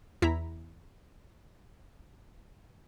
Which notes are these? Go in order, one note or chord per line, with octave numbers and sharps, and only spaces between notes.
E2 E4 A#5 B6